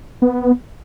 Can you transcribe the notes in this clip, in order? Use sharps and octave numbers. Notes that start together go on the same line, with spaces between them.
B3